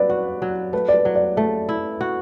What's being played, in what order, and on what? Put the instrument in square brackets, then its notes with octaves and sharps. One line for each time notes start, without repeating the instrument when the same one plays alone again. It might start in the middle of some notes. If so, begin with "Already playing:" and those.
Already playing: [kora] F#3 [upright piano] B4 D5 B5
[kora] F#4
F#3
[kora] A3 [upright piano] B4
[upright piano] D5
B4
[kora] F#3
[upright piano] D5
[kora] A3 [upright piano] E5
[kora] E4
F#4